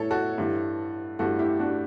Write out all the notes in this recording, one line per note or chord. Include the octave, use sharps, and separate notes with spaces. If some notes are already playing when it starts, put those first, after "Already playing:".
Already playing: A2 E3 A4 C#5
F#4 A4
G2 E3
G2 E3 F#4 A4
E4 G4
D4 F#4